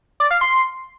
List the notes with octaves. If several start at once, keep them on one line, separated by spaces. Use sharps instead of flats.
D5
F5
C6